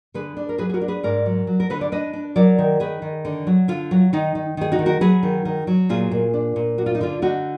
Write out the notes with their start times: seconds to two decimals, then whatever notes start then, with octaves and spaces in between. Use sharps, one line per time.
0.14 D3 G#4 B4
0.37 D4
0.49 A#4
0.58 F#3 G#4 B4
0.69 G#4
0.74 F#4 A#4
0.81 D4
0.88 G#4 B4
1.03 G#2 A#4 D5
1.26 F#3
1.47 F#3
1.60 A#4
1.70 D3 B4
1.81 D5
1.92 D4 B4 D#5
2.13 D4
2.36 F#3 A#4 D5
2.58 D#3
2.80 D#3 G#4 B4
3.02 D#3
3.25 D3
3.47 F#3
3.68 D3 F4
3.91 F#3
4.13 D#3 D#4
4.35 D#3
4.57 D#3 G#4
4.72 D#4 F#4
4.79 D#3
4.86 F#4 A#4
5.01 F#3 G#4 B4
5.23 D#3
5.45 D#3
5.67 F#3
5.89 A#2 F4 G#4
6.11 A#2
6.34 D4
6.56 A#2
6.78 D4 F#4
6.86 F4
6.95 D#4
7.01 D3 F4
7.22 D3 D#4 F#4